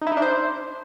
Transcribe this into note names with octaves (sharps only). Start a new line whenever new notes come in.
D#4
E4
D#4
D4
C5